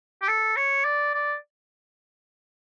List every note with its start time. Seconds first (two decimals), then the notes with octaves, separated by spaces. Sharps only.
0.22 G4
0.29 A4
0.56 C#5
0.85 D5
1.14 D5